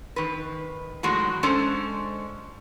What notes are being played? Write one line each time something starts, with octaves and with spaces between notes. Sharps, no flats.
D#3 B4
A2 D#3 F#3 G#3 F#4
G#3 C#4 D4 A4 C5 D5